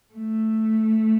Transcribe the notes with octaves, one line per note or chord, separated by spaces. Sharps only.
A3